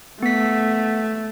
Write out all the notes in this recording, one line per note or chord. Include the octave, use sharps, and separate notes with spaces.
A3 B3 B6